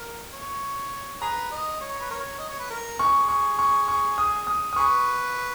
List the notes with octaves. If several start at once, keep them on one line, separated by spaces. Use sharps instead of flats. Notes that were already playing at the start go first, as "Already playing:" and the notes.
Already playing: A#4
C#5
G#4 B4 A#5
D#5
C#5
B4
A#4 C#5
D#5
C#5
B4
A#4
B3 D#4 G#4 C#6
C#6
C#6
C#6
D#6
D#6
D#6
G#4 B4 C#6